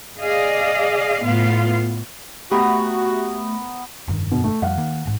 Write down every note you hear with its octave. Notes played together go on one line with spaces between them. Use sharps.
G#4 D5 D#5 F5
A2 B3 F4 F5
A3 B3 F#4 G4 A#5
F1 G2 D#3
B2
A3
F2 F3 G3 F5 F#5
D#3 A#3
A1 G#2